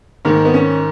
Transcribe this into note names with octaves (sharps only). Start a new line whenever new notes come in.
G#2 D#3 A#3
B3
C#4